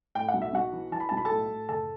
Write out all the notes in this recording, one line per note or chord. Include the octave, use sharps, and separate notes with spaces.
A2 G5
F#5
B1
E5
B1 F#4 F#5
E3
E3 A5
B5
B1 A5
B5
A4 A5
A2
A2
F#1 A4 A5